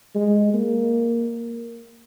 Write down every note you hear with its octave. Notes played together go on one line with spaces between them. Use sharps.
G#3
A#3